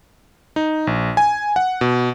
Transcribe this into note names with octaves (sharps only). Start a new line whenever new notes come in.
D#4
A#1
G#5
F#5
B2